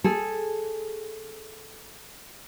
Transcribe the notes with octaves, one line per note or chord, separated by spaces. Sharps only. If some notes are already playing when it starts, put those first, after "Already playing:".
G#4 A4